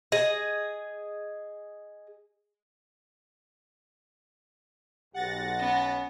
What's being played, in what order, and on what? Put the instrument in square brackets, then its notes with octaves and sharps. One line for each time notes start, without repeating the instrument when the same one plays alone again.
[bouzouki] G#4 D#5
[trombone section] B1 [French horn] G4 [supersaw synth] F#5 A6 A#6
[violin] B3 [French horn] C#4